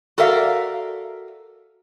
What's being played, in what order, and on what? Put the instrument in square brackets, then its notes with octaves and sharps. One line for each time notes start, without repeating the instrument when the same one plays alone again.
[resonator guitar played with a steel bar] F#4 A4 A#4 D5 E5 F5